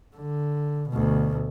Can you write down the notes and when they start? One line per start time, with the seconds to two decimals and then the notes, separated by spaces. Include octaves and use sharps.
0.17 D3
0.90 D2 B2